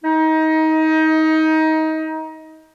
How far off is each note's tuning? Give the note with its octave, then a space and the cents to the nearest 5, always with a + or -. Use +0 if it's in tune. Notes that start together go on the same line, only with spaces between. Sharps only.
D#4 +25